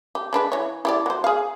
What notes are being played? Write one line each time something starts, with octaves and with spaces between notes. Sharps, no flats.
G4
G#3 D4 B4
E3 C#5
E4 G4 D5
F#3 C5
G#4 F5